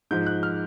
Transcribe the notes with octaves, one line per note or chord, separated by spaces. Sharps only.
G#2 F3 G6
F#6
F6